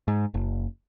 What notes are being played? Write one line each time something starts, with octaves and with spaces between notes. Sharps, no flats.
G#2
F#1